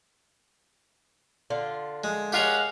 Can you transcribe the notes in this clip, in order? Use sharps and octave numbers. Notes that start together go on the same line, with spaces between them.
D3 F4
G#3
G#3 G4 A#4 C#5 F5 F#5